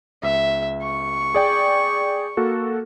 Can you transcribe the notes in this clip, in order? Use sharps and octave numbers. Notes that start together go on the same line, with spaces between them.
C#2 E5
C#6
G#4 D5 G5
A#3 F#4 A4